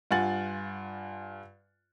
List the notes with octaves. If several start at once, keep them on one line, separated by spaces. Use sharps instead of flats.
G2 F4 F#5 G#5 A6 F#7